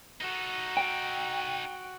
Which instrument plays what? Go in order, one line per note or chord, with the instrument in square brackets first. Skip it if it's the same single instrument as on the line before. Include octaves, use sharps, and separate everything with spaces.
[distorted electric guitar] D#4 A4 [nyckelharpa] F#4
[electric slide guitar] G5